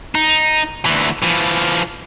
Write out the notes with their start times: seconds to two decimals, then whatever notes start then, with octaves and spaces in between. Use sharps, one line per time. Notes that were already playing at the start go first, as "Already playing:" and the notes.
0.15 D#4
0.85 D2 E3
1.22 E3 F3